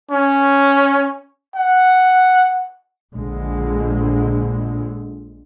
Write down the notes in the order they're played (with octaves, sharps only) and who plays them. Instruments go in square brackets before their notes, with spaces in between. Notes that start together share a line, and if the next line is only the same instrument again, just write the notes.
[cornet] C#4
F#5
[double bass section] A#1 D3 G#3